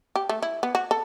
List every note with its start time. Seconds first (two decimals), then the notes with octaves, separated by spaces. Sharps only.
0.16 G4
0.29 A3
0.43 E4
0.63 B3
0.75 F#4
0.91 A4